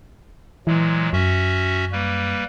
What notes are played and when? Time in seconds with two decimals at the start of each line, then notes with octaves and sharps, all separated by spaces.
0.67 A#2 E3 F#3 G#3
1.13 F#2 C#4 F#4 E5
1.92 G3 A#3 B4